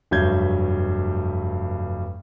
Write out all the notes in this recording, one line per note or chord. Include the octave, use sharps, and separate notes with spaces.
F1 G2 F#3 E5 G6 G#6